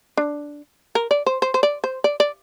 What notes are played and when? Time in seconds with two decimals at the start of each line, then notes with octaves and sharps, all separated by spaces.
0.17 D4
0.95 A#4
1.11 D5
1.26 C5
1.42 C5
1.54 C5
1.63 D5
1.84 C5
2.04 D5
2.20 D5